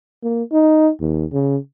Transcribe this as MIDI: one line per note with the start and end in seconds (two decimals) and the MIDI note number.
0.23 0.43 58
0.52 0.89 63
1.00 1.25 39
1.33 1.57 49